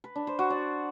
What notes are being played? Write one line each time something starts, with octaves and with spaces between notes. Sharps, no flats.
B4
D4
C5
F#4
D5